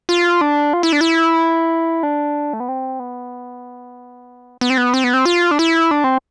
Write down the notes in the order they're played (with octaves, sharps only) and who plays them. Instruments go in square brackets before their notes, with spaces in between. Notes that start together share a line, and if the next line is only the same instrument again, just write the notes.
[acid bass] F4
D4
F4
E4
D4
E4
D4
A3
B3
C4
B3
B3
C4
B3
C4
B3
C4
F4
D4
E4
D4
C4